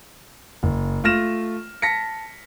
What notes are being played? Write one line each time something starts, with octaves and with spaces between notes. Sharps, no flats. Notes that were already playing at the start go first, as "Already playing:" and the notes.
F#1
A3 F4 F6 A#6 E7
A5 A#6 B6 C#7